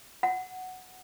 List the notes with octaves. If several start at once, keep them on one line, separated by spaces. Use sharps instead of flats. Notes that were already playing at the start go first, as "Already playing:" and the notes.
F#5